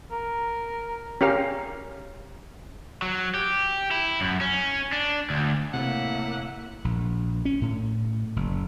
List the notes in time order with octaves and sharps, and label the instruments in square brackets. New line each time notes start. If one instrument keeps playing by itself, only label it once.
[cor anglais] A#4
[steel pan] C#4 G4 A#4 F5
[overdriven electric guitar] F#3
G4
E4
F#2
C#4
D4
D2
[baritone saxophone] A2 [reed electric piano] C3 [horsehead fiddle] A#3 E5 [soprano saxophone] F#5
[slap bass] A#1
C#4
A2
F#1